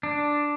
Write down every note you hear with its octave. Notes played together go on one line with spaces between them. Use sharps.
D4